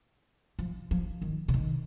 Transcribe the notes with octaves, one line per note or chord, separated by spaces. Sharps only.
F3
F3
D#3
C#3
D#3